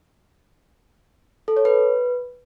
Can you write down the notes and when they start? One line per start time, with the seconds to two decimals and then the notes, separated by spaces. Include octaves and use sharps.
1.48 A4
1.57 C#5
1.65 B4